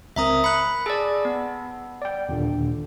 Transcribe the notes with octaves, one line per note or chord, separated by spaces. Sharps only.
C#2 C4 A#4 E5 A#5 D#6
B5 F#6 C#7
G#4 D5 A5 B5 E6
B3
D5 G5
D#2 A#2 D3